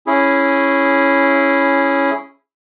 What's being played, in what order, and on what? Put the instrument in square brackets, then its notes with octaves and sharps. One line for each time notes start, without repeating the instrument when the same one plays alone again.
[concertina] C#4 E4 G#4